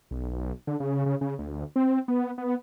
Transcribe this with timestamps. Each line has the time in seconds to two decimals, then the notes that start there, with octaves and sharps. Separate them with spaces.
0.11 B1
0.67 D3
0.80 C#3
1.06 C#3
1.21 C#3
1.39 D2
1.76 C4
2.08 B3
2.38 B3